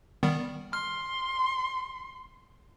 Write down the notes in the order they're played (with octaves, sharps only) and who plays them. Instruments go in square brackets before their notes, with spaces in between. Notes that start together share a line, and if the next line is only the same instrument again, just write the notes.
[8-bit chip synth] D#3 G3 B3
[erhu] C6 [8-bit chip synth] F6